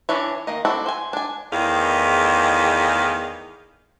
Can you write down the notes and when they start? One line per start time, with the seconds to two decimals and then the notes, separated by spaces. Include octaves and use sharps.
0.09 E3 C#4 D4 E4 C#5
0.47 D#3 A#3 D#5
0.65 C4 D4 E4 F#4 A4
0.86 C5 G#5
1.13 D4 G#5
1.52 E2 A2 D#3 G#4 F5